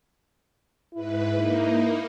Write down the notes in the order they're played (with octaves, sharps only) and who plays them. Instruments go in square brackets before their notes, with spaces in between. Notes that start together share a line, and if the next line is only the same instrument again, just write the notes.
[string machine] G#2 B4 [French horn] E4
[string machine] A#3 D#4